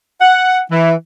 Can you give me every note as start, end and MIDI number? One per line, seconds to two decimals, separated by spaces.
0.21 0.59 78
0.71 0.93 52